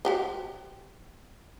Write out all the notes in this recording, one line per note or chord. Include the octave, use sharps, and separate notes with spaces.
F#4 G4 C5